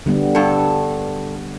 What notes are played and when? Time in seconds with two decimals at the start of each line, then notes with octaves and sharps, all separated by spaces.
0.06 D3 G3 B3
0.35 G2 A4